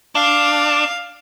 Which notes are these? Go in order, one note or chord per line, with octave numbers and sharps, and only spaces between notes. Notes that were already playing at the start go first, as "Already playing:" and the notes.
D4 F5